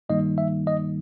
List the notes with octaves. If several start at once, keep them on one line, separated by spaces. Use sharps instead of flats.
G2 D#3 G3 A#3 D#4 D#5
E5
D#5